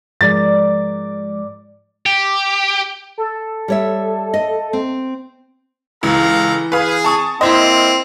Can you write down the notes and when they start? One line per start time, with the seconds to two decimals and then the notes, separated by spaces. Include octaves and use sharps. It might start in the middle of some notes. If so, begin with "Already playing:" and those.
0.21 G#2 F3 G#3 A#4 D5 A6
2.06 G4
3.18 A4
3.68 G3 C#5 E5
4.34 D#5
4.73 C4
6.03 C#2 E3 A4 F5 A#5
6.72 G#4 B4 F5
7.04 A5 C#6 D#6
7.41 A#3 C4 E4 C5 D#5